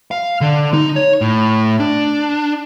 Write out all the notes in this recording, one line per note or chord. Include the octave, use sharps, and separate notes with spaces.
F5
D3
D#4
C#5
A2
D4